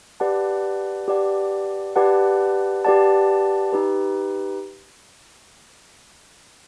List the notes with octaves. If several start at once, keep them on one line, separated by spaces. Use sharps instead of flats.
G4 B4 D5 F#5 A5
G4 B4 D5 F#5 A5
G4 B4 D5 F#5 A5
G4 B4 D5 F#5 A5
D#4 G4 B4